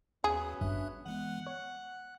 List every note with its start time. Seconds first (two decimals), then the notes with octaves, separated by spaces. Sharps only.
0.24 D#2 F#3 B3 C#4 G#4
0.61 G#1 G2 D4 E5 F#6
1.06 E3 G#3 B3 F#5
1.47 C#5 F#6